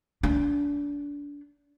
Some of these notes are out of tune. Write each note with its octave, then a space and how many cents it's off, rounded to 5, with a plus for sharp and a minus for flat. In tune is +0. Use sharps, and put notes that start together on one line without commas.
D4 -30